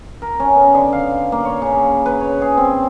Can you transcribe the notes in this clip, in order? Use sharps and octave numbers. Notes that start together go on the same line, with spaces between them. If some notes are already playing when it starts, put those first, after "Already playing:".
A#4
C#4
B3
D3
F5
A#3
C#5
C#3
B4
C#5
G#4
C4